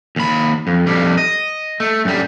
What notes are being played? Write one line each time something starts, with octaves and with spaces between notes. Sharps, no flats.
D#2 B5
F2
F2 G3
D#5
A3
F#2 G3